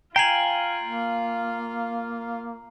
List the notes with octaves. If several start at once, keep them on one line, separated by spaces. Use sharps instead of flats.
F4 F5 G5 G#5 A#5 C7 F#7
A#3